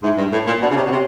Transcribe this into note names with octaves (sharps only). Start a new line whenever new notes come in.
G#2 E4
G2
A2
A#2
B2 D4
C#3
C3 C#4
B2
C3